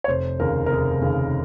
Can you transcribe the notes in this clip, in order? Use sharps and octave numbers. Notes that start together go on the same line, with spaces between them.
C#5
F1 C5
D#2 C#3 A#4
A#4
F1 G#4
D#2 C#3